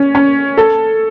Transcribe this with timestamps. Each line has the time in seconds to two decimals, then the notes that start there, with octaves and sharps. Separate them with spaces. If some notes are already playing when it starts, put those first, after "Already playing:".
Already playing: C#4
0.15 C#4
0.57 A4